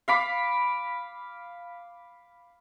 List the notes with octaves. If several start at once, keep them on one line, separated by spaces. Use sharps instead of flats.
F5 B5 D6